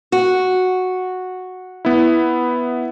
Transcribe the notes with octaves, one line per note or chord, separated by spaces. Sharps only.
F#4
B3 E4